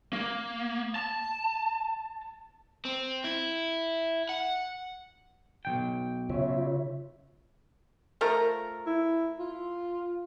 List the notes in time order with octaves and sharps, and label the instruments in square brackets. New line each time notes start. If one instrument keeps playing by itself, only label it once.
[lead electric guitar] A#3
A5
[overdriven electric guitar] C4
E4
F#5
[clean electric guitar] B1 D#3 G5
[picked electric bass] C#3 [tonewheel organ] F4 C#5 E5
[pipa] F3 A3 A#4
[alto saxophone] E4
F4